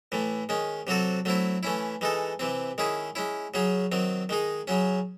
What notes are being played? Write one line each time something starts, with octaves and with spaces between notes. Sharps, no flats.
A2 E3 A3
D#3 G#3 C#4
C3 F#3 C4 F#4 A4
F#3 A3 C4 E4
E3 A3 C#4 E4
E3 G#3 D#4 A4
C3 E3 C4
D#3 G#3 C#4 E4 G#4
G#3 C#4 E4
C#3 F#3 C#4 G#4
D#3 F#3 C4
D#3 G#3 D#4 G#4
C#3 F#3 C#4